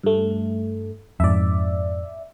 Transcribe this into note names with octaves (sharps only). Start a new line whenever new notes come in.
G2 A3
F2 G#2 D5 E5